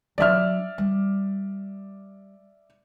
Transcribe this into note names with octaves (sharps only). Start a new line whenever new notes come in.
F#3 D4 D5 E5 F6
G3